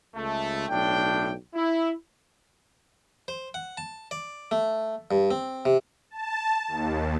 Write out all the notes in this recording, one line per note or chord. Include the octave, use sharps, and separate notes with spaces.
C#2 A3
B1 A2 D4 G5
E4
C5
F#5
A5
D5
A3
G2
C4
C3
A5
D#2